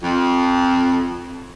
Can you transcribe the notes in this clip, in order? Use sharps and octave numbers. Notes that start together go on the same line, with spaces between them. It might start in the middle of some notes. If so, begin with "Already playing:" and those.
F2